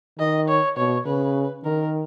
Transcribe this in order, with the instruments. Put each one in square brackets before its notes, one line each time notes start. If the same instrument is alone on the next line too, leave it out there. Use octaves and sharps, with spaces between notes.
[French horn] D#3 [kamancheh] D#5
[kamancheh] C#5
[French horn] B2 [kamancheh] C#5
[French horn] C#3 [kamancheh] B4
[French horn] D#3 [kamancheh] A#4